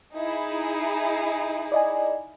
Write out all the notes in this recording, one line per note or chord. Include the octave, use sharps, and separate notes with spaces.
D#4 E4 G#4
D5 D#5 G#5